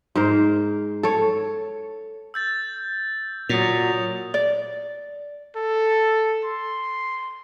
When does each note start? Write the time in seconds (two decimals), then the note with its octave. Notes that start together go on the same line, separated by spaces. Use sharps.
0.15 G#2 A#4 C5
1.03 A4 C#5
2.34 E6 G6 A6
3.49 A#2 F#3 D#6 C#7 F7
4.34 D5
5.56 A4
6.44 C6